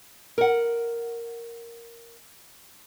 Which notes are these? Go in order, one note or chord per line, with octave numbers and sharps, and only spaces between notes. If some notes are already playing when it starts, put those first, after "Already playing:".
A#4 F#5